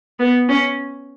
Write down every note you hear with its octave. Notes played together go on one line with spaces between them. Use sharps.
B3
C#4